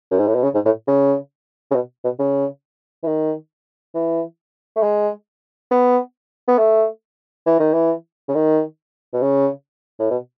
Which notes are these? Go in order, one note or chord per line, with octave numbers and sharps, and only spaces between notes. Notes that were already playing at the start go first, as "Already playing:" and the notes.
F#2
G#2
A2
B2
C#3
G#2
A2
C#3
C#3
B2
B2
C#3
E3
D#3
E3
A3
G#3
B3
B3
A3
E3
D#3
E3
C#3
D#3
B2
C#3
A2
B2